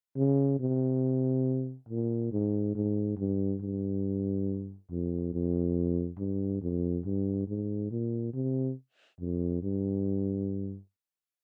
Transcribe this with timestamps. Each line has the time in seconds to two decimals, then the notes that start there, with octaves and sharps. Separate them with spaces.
0.17 C#3
0.60 C3
1.89 A#2
2.32 G#2
2.75 G#2
3.17 G2
3.61 G2
4.90 F2
5.33 F2
6.19 G2
6.61 F2
7.05 G2
7.48 G#2
7.91 A#2
8.33 C3
9.20 F2
9.62 G2